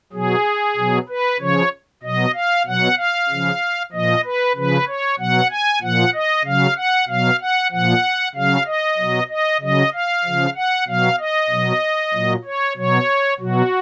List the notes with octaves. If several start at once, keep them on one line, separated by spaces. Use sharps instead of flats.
B2 F#3 G#4
B2 F#3
B4
C#3 F3 C#5
B2 F#3 D#5
F5
B2 F#3 F#5
F5
C#3 F3
A#2 F3 D#5
B4
C#3 F3 B4
C#5
B2 F#3 F#5
G#5
A#2 F3 F#5
D#5
C#3 F#3 F5
F#5
B2 F#3 F5
F#5
A#2 F3 F#5
C#3 F#3 F5
D#5
B2 F#3
D#5
C#3 F#3 D#5
F5
C#3 F3
F#5
B2 F#3 F5
D#5
B2 F#3
A#2 F#3
C#5
B2 F#3 C#5
B2 F#3 F#4